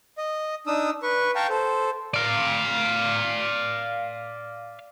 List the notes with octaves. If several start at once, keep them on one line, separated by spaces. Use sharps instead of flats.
D#5
D4 D#4 D#6 E6
B4 C#6
F5 G5 A5 A#5 C#6
A4 C5
D5 F5